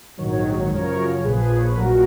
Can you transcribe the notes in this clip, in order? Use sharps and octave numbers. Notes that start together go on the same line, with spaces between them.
A#1 G#2 D#3 F#3 C#5
C#5
C#5
C#5
F#2 C#3 F3 A#4 C#5
C#5
A#1 A#2 F3 G#4 B4
C#5
B4
A#1 A#2 F#3 F#4 A#4